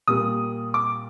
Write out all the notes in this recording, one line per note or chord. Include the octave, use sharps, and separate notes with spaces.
A#2 G3 A#3 D#6
D6